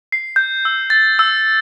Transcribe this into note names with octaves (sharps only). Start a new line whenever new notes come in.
C7
G6
E6
A6
E6